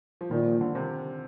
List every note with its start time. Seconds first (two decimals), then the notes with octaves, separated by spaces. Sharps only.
0.21 F3
0.30 A#2 D#3
0.46 F3
0.61 D3
0.75 C3